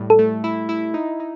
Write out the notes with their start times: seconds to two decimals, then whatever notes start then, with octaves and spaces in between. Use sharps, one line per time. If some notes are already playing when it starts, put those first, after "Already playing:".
Already playing: A2 G3
0.10 A4
0.19 A3
0.44 E4
0.69 E4
0.94 D#4
1.20 D#4